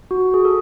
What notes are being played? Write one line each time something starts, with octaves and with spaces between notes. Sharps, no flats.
F#4
G#4
A4